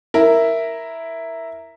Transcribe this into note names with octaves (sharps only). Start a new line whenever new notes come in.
E4 A#4 E5